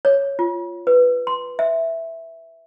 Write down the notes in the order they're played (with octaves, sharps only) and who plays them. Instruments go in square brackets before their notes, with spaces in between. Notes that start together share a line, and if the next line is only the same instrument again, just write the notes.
[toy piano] C#5
F4
B4
C6
E5